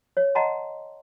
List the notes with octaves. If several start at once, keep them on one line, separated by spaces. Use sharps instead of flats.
C#5
D#5 F#5 A5 A#5 C6